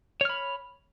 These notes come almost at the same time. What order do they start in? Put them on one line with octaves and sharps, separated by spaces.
C#5 F6 B5